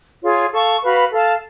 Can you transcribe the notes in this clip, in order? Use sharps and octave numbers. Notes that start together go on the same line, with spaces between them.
F4 G#4 C#5
A4 F5 A5 C#6
F#4 B4 F5 B5
A4 F5 A5